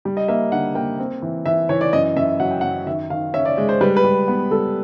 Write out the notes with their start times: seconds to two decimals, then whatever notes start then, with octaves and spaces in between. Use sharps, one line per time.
0.05 G3
0.17 D#5
0.28 A#3 E5
0.52 D3 F#5
0.75 A#3 G5
0.99 C4
1.22 E3
1.46 E3 E5
1.69 E3 C#5
1.81 D5
1.93 F#2 D#5
2.16 F#2 E5
2.40 F#3 F#5
2.51 G5
2.61 F#5
2.64 F#2
2.86 D#3 E5
3.10 D#3 F5
3.34 C#4 E5
3.45 D5
3.58 G#3
3.69 C5
3.81 G3 B4
3.97 B4
4.04 G3
4.28 B3
4.51 G3 A4